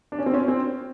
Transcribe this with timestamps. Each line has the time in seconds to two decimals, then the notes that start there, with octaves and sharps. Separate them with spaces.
0.12 D4
0.19 C#4
0.26 C4
0.34 C#4
0.48 C4